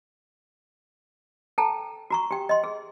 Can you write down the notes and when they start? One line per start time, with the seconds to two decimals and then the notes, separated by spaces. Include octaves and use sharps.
1.58 A4 G5 A5 A#5
2.10 F#4 A#5 C#6
2.31 G4 G5
2.49 D#5 C6
2.64 G#4